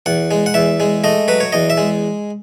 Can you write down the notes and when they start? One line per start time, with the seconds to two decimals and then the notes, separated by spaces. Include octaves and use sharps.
0.06 E2 F#5
0.31 G#3
0.46 F#5
0.54 E2 E5
0.80 G#3
1.04 A3 D#5
1.28 F#3 B4
1.40 C#5
1.52 E2 D#5
1.70 E5
1.77 G#3